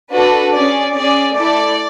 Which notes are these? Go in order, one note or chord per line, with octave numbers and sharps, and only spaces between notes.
D4 F#4 A4 B4
C#4 G#4 D5
C#4 G#4 D5
A3 E4 A4 D5